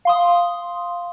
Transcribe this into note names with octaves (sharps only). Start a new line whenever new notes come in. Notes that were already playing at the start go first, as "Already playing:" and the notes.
F5 C6 D#6